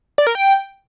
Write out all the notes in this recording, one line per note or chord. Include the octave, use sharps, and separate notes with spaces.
D5
A#4
G5